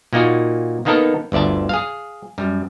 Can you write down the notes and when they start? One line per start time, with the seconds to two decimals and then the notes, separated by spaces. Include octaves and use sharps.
0.13 A#2 A#3 D#4 F#4
0.85 D#3 A#3 B3 D#4 A4 A#4
1.32 G1 D2 D5 E5 A5
1.69 G#4 F5
2.38 F#2 G3